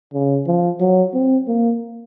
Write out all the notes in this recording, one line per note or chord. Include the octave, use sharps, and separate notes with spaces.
C#3
F3
F#3
C4
A#3